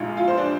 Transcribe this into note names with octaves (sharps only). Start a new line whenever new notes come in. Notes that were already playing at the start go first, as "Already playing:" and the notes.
Already playing: A#1 A#2 G#3 D#4 F4
F4
C5
D4